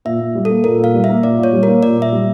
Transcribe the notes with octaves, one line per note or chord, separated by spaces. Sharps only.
A#2 E5
A#2
G3
A#3 A4
A#2 A#4
A#2 F5
G3
E5
A#3
A#2 D5
A#2
C#5
G3
A#3 A#4
A#2 D5
A#2 E5
G3